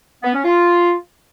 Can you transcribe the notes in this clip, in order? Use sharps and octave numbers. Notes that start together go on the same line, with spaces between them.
B3
C#4
F4